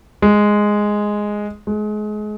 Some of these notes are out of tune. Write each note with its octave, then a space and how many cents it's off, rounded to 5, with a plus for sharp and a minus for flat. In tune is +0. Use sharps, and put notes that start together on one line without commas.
G#3 +0
G#3 +30